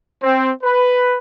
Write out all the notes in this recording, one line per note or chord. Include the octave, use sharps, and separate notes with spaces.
C4
B4